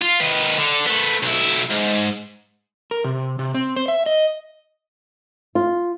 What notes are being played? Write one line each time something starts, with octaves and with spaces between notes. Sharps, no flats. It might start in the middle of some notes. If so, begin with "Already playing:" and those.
F4
D#3 B4
D3
A3 B3
B1 E4
G#2
A#4
C3
C3
C4
C5
E5
D#5
F4